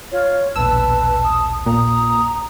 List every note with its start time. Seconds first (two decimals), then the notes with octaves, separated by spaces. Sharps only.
0.12 F4 C#5
0.56 D#1 A#1 B2 B4 A5 E6
1.24 D#6
1.66 A#2 A#5 D#6